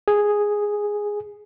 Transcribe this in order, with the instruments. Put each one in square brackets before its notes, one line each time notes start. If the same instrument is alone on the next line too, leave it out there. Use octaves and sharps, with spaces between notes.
[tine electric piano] G#4